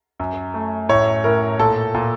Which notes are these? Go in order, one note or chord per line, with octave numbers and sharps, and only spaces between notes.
F#2
A3
A2 C#5
A2 A#4
A#2 A4
A#2